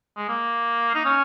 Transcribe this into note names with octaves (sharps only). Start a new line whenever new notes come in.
G#3
A#3
D#4
C#4